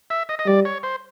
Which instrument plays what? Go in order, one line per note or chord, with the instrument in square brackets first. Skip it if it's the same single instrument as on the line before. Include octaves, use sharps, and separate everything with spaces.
[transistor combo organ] E5
D#5
D#5
[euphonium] G3 [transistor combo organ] D5
[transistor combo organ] C#5
C5